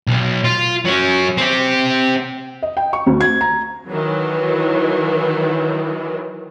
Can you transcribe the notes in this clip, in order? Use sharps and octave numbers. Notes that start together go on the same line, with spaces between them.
B1
F4
F#3 C#4
C4 G4
D#5
G5
C#6
D2
G#6
A#5
D#3 E3 F#3